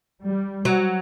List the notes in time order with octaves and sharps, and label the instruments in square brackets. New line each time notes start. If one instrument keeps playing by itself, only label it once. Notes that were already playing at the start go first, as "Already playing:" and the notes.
[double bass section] G3
[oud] F#3